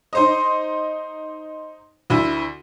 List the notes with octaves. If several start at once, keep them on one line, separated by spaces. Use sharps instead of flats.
D#4 C5 D#5
D2 E4